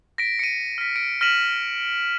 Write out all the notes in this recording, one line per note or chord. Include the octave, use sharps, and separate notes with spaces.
A#6 B6 D7
C#7 D#7
F6 B6
D7
F6 A#6 B6 D#7 E7 F#7